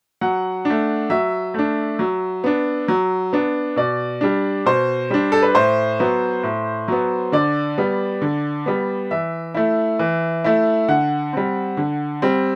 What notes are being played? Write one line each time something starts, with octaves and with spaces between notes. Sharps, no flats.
F#3 F#5
D4
A3
F#3 E5
A3 D4
F#3
B3 D4
F#3
B3 D4
B2 D5
G3 D4
B2 C5
G3 D4
A4
B4
A2 C5
F#3 B3
A2
F#3 B3
D3 D5
G3 B3
D3
G3 B3
E3 E5
A3 E4
E3
A3 E4
D3 F#5
G3 C4
D3
G3 C4